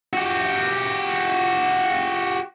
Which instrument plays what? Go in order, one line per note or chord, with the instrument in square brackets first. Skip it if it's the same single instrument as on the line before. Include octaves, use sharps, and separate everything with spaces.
[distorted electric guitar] F#4 G4